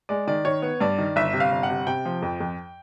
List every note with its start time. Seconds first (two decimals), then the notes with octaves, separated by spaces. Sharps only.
0.09 G#3 D5
0.27 D#3 D5
0.45 D#3 C#5
0.62 B3
0.80 G2 D5
0.98 D#3
1.16 G1 E5
1.33 C3
1.40 F5
1.52 G1
1.63 F#5
1.70 C3
1.86 C3 G5
2.05 F3
2.22 F2
2.40 F2